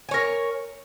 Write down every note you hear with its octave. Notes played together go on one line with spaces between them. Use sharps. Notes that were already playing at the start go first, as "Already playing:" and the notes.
A#4 C#5 G#5